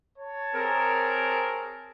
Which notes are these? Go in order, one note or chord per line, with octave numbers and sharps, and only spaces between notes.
C#5 A5
C4 G#4 A#4